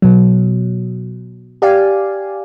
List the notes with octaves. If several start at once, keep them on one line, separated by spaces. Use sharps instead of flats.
B2 F#3
G4 D5 F5 G#5